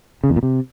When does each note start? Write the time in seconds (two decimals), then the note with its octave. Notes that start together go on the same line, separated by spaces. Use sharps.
0.24 C#3
0.30 E2
0.36 A#2
0.43 C3